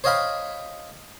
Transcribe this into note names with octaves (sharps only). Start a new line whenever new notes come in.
C5 C#5 D#5 F5 G5 B5